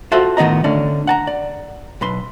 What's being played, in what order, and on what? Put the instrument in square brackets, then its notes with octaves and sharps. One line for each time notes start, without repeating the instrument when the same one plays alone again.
[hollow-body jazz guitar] F4 F#4 A4 C5 E5
A2 D#3 B3 D#5 A#5
D3 A3 C#4 D5
F#5 A5 A#5
D5
B1 B4 C6